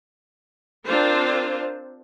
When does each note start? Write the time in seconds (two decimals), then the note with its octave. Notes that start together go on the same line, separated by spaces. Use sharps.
0.86 C4 D4 F4 A#4 C5